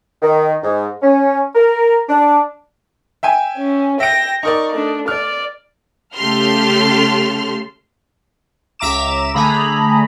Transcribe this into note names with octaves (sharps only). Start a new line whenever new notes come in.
D#3
G#2
C#4
A#4
D4
E5 G5 G#5
C#4
E5 G5 A#6 D7
D#4 A#4 D5 C#6
A3 D4
D5 F6
C#3 A3 G4 A4 C6 F6
C#2 E5 A#5 D6 E7
D3 A3 G#4 A#5 B5